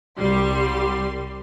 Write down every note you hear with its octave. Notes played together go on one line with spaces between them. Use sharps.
C2 G3 C6